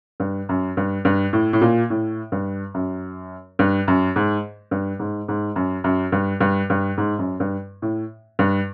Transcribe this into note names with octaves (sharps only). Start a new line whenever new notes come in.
G2
F#2
G2
G2
A2
A2
A#2
A2
G2
F#2
G2
F#2
G#2
G2
G#2
G#2
F#2
F#2
G2
G2
G2
G#2
F#2
G2
A2
G2